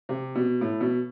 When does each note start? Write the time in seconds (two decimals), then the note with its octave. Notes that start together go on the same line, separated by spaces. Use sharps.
0.09 C3
0.35 B2
0.61 A2
0.80 B2